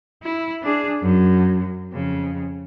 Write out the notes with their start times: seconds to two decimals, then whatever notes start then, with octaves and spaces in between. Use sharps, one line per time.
0.23 E4
0.63 D4 G#4
1.03 F#2
1.92 F2 C#3